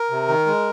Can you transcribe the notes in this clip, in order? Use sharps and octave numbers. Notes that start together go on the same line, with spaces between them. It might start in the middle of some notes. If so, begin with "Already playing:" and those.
Already playing: A#4
C3
D#3
G#3